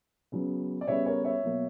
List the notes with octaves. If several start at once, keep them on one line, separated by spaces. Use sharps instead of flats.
C#3 F#3 B3
D5
C#3 G3 B3 C#5 E5
A#4 C#5
C#5 E5
B2 F#3 A#3